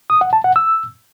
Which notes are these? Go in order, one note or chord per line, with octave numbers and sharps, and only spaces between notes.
D#6
F#5
A5
F#5
E6